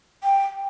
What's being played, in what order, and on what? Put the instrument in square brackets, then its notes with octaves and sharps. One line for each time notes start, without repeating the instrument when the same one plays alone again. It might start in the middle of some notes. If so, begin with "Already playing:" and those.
[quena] G5